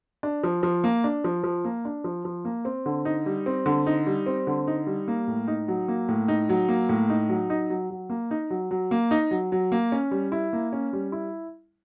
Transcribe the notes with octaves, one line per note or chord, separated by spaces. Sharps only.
D4
F3
F3
A#3
D4
F3
F3
A#3
D4
F3
F3
A#3
C4
D3
D#4
G3
C4
D3
D#4
G3
C4
D3
D#4
G3
A#3
A2
D#4
F#3
A#3
A2
D#4
F#3
A#3
A2
D#4
F#3
D#4
F#3
F#3
A#3
D#4
F#3
F#3
A#3
D#4
F#3
F#3
A#3
C#4
G3
E4
A#3
C#4
G3
E4